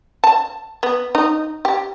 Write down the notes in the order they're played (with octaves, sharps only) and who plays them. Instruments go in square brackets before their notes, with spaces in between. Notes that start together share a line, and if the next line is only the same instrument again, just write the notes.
[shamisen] A5
B3
D#4
G4